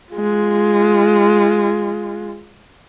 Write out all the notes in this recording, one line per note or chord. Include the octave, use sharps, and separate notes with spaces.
G#3 F4